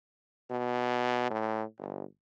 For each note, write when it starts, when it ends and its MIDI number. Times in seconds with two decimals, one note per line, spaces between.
0.51 1.27 47
1.30 1.64 45
1.78 2.04 31